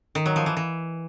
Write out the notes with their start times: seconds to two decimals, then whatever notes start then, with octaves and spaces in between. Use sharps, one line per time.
0.15 D#3
0.26 F#3
0.36 F3
0.46 E3
0.57 E3